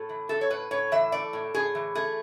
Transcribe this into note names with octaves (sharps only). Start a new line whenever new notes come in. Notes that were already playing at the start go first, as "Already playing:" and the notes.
Already playing: A2 A4
E3
A3 A4
C#5
A2 B4
A2 C#5
E3 E5
A3 D5
A2
A2 G#4
E3
A3 G#4